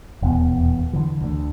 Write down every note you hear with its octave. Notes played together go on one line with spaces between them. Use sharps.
D#1 E2 B2 B3
D3 E3
D2 D3